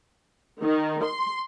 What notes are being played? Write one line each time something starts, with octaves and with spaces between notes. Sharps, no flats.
D#3
C6